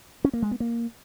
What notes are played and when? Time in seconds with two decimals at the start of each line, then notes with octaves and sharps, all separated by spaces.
0.24 C#4
0.33 A#3
0.42 G#3
0.51 B3
0.60 A#3